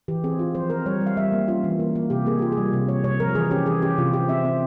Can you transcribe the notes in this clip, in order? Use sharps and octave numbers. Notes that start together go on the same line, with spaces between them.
E3 G4
C4 G#4
F4
F3 C5
C4 A#4
G3 C#5
G3
F5
G3 E5
A#3
C#4 F4
E3
A#3
A#3
C3 G4
A#3 G#4
F4 G4
G#4
G3
C3
C3 C#5
C3 C#5
F3 A#4
E3 G#4
C#4 G4
E3 G#4
C#4 G4
C3 F4
C4 G4
C4 E5
C4